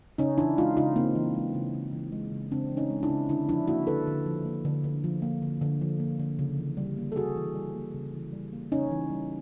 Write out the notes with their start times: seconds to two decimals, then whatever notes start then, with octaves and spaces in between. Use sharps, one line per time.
0.18 C#3 C#4 D#4
0.38 E3 D4 E4
0.58 G#3 D#4 F4
0.77 C#3 D#4 F4
0.96 C#3 A#3 C4
1.15 E3
1.35 G#3
1.55 C#3
1.75 C#3
1.93 E3
2.12 G#3
2.32 C#3
2.51 C#3 C4 D4
2.71 E3
2.77 C#4 D#4
2.90 G#3
3.03 D4 E4
3.09 C#3
3.29 D3 D4 E4
3.49 F3 D4 E4
3.67 A#3 E4 F#4
3.87 D3 A4 B4
4.07 D3
4.26 F3
4.45 A#3
4.65 D3
4.84 D3
5.04 F3
5.22 A#3
5.42 D3
5.61 D3
5.81 F3
6.00 A#3
6.20 D3
6.39 C#3
6.58 E3
6.77 G3
6.97 A#3
7.12 A4
7.16 C#3 F#4 G#4
7.36 E3
7.55 G3
7.75 A#3
7.94 C#3
8.14 E3
8.33 G3
8.53 A#3
8.71 C#3 C#4 D#4
8.91 E3
9.10 G3